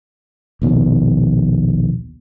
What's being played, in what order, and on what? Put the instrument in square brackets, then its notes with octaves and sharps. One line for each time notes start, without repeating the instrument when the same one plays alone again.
[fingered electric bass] A#1 D#2 B2